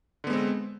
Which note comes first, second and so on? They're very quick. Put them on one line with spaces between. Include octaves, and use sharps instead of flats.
D3 B3 G#3 C4